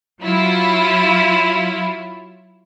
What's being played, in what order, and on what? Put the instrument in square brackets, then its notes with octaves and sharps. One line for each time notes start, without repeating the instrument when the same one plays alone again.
[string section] F#3 E4 F4